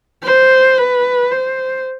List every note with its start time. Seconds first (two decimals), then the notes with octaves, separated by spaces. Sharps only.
0.24 C5
0.78 B4
1.32 C5